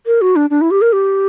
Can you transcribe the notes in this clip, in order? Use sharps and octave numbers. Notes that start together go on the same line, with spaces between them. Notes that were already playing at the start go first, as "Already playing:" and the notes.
A#4
F#4
D4
D4
E4
G4
A#4
G4